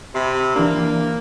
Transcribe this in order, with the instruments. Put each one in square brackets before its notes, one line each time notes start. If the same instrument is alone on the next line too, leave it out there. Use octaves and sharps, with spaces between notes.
[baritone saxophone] C3 [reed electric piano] B5 C6
[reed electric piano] E3 D4 [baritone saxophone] A#3